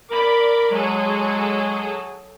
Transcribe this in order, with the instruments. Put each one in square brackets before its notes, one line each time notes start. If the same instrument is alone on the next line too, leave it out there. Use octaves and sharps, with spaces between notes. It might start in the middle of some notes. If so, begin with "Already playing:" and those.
[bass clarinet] A#4 [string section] D5 B5 D6
[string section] F#3 G#4 A4 [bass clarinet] G#3